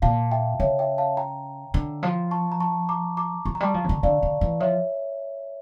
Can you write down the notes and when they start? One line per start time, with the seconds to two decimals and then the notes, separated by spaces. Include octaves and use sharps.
0.02 A#2 F5 A5
0.31 E5 G5
0.60 C#3 C#5 E5
0.79 E5 G5
0.98 F5 A5
1.17 G5 A#5
1.74 D3
2.03 F3
2.31 A5 C#6
2.52 A#5
2.60 A5 C#6
2.89 A#5 D6
3.17 A#5 D6
3.45 F3 C#6
3.55 A#5
3.60 G3 A5 C#6
3.74 F3
3.84 C#3
3.89 D3
4.03 D3 D5 F5
4.23 D3
4.41 E3
4.60 F3 C#5 E5